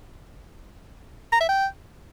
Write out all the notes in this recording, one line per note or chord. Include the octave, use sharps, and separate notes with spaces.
A#5
E5
G5